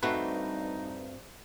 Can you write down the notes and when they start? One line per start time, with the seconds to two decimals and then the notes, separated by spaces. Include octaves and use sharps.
0.03 G2 A3 C4 D#4 F#4 B4